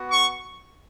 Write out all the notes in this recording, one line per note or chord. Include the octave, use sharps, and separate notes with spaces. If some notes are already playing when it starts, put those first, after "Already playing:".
Already playing: B3 F#4
C#6